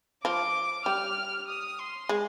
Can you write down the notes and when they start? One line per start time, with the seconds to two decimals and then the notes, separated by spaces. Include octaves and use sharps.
0.25 F3 D6
0.86 G3 F6
1.48 D#6
1.79 C6
2.09 G#3